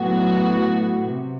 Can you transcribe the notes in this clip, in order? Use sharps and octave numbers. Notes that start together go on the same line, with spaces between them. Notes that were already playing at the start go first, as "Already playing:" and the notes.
Already playing: A2 F#3 B3 F#4
C3